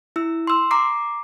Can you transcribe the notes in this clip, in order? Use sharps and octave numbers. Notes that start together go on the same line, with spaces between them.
E4 E6
C6 E6
A#5 D6 C7